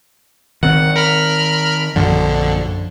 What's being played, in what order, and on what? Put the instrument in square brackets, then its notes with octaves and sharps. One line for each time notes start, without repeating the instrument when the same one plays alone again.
[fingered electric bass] D#3 C4 [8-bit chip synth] F#5
[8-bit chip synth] A#4 B5 F6
[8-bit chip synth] A#1 D3 [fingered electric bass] F#2 F3